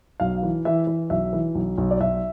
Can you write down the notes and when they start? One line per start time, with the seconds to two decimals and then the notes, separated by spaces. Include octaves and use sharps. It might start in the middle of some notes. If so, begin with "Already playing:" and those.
0.20 B1 F5
0.43 E3
0.65 E3 E5
0.87 E3
1.10 B1 E5
1.33 E3
1.55 B1
1.78 B1
1.91 D5
2.00 B1 E5